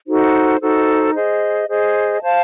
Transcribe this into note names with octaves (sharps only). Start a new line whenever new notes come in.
D#4 F#4 A4 C5
D#4 F#4 A4 C5
G#4 C5 D#5
G#4 C5 D#5
C5 F5 A5